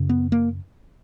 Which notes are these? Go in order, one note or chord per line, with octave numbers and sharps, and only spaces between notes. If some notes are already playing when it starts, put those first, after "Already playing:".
Already playing: F#2 C#3
B3
A#3